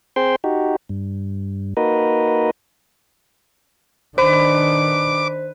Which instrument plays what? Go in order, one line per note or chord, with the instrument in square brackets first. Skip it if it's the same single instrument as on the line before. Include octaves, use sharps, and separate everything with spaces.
[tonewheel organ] C4 G#4 C5 G5 C6
D#4 F#4 G4
G2
A#3 D#4 F#4 A#4 B4 D#5
[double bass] D#3 D4 [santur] B4 [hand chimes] C5 [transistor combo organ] D6